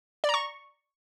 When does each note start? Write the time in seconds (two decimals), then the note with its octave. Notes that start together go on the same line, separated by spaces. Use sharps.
0.24 D5
0.29 A#5
0.34 C#6